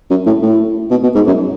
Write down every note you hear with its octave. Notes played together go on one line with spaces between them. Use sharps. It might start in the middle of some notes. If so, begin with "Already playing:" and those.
F#2
A2
A2
B2
B2
G#2
F#2